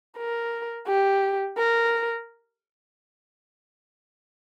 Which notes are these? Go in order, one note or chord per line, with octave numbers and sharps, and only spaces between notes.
A#4
G4
A#4